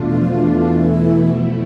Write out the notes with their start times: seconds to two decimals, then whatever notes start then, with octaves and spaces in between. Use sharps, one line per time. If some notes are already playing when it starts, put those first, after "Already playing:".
Already playing: E2 B2 A3 D4 F4
0.09 E3
0.21 F3
0.32 E3
0.72 E2 B2 A3 E4
1.36 F3